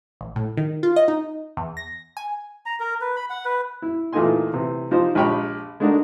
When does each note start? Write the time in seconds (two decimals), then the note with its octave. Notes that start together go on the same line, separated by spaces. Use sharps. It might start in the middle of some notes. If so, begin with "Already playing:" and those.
0.21 A1
0.36 A2
0.57 D#3
0.83 F4
0.96 D#5
1.08 D#4
1.57 E2
1.77 A#6
2.17 G#5
2.66 A#5
2.80 A#4
3.01 B4
3.16 B5
3.30 F#5
3.45 B4
3.82 E4
4.13 E2 A#2 A3 D#4 G#5 C6
4.53 A2 C3 E3
4.91 F3 D#4 F4 G4 C5
5.15 A#1 G#3 G4 C#5 G5 B5
5.80 G#3 A3 D4 D#4 F#4 A#4